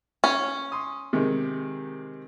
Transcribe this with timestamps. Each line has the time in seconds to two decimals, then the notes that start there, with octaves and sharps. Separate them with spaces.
0.24 C#4
0.72 C6 D#6
1.13 C3 D#3 G#3